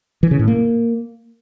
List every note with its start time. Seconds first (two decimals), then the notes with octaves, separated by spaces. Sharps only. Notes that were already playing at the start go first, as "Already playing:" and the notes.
0.23 E3
0.31 C#3
0.39 A2
0.48 A#3